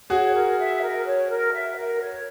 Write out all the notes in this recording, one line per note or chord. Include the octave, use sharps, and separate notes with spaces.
F#4 G#4 C#5
A#4
E5
A#4
C#5
A#4
E5
A#4
C#5